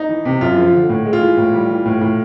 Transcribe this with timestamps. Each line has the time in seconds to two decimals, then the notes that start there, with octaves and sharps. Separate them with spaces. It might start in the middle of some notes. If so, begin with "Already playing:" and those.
Already playing: D#4
0.09 E3
0.25 C3
0.41 F#2 F4
0.58 F3
0.73 D3
0.89 A2
1.05 G#3
1.13 F4
1.21 E3
1.37 A2
1.53 G3
1.70 E3
1.85 A2
2.01 A2